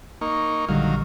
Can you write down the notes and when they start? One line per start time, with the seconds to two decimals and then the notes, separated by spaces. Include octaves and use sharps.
0.21 A#3 D#4 C#6
0.68 A#1 D3 D#3 F#3 G3 F5